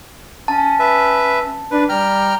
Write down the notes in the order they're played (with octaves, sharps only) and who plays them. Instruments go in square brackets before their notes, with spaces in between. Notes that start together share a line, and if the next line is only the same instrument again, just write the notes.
[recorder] C#4 [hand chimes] A5
[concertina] B4 E5
[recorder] D4 [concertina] B4
[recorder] G3 [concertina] G5 A#5 F6